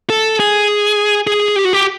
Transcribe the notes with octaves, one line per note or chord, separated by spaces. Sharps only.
A4
G#4
G#4
G4
F#4
G4